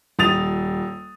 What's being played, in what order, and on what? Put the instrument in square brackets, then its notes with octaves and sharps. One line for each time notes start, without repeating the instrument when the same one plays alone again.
[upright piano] D#1 D#6 A6 F7